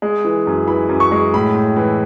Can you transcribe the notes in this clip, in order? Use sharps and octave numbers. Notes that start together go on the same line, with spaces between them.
G#3
E3
F#2
E3 B5
F#2
C#6
G#3
A2 B5
A2
E3